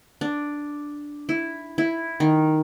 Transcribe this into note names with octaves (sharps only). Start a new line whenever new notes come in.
D4
E4
E4
D#3